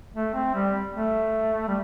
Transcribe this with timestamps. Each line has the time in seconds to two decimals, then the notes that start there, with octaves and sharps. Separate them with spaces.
0.14 A3
0.34 C4
0.55 G3
0.94 A3
1.68 G3